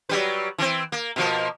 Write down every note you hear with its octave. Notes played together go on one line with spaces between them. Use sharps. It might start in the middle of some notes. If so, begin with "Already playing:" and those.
F#3 G3 B4
E3 C4
A#3
B2 F3 A#3